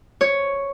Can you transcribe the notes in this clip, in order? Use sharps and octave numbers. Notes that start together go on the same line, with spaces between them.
C#5